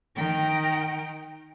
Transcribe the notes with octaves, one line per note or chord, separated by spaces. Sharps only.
D#3 G5